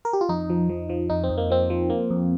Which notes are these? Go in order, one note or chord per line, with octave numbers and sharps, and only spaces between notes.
A#4
G4
F4
F2 D#4
F3
F3
F3
F2 D#4
C4
F2
A#3
F3 C4
F3
A#3
F2